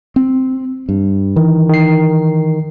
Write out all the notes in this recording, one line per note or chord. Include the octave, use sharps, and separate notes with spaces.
C4
G2
D#3 E3
D#3 C7